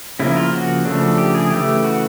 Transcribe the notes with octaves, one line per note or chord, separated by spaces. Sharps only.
C#3 F3 A#3 E4
F4
F#4
C#3 F3 A3 D4
G4
G#4
C#3 E3 A3 G4
F#4